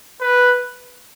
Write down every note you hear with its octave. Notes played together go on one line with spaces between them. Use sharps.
B4